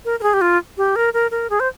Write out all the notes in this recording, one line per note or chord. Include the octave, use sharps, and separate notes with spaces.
A#4
A#4
G#4
G4
F4
G4
A#4
A#4
A#4
G#4
C5